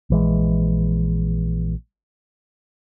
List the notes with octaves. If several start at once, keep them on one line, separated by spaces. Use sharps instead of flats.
A#1 E3 G#3